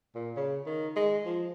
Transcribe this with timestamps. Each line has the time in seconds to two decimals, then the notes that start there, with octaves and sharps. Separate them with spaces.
0.15 A#2
0.37 C#3
0.66 D#3
0.96 G#3
1.25 F3